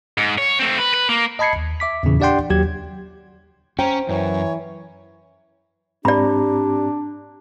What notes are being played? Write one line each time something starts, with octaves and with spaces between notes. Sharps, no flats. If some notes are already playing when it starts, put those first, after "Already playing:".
G#2
C#5
A3 C4
B4
B4
A#3
D#5 A5 B5 G#6 C7 C#7
D#2
E5 D6 B6
E2 A#2 C#3 E3
D4 G4 D5 F#5 G5 C6
D#2 F#3 G4 G#6
C#4 C5 G5 A#5
F#2 E3 C#5
G#2 C4 D4 G4 D5 A#5 B5